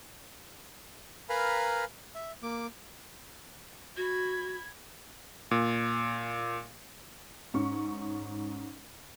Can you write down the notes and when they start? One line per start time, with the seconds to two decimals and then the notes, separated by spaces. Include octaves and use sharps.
1.29 A#4 B4 F5 G#5 A#5 B5
2.15 E5
2.43 A#3 D6
3.97 F#4 B5 G#6
5.51 A#2
7.54 G#2 C#4 C#6